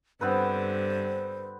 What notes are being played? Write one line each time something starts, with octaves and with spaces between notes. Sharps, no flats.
G2 D3 B3 C4 B4 C5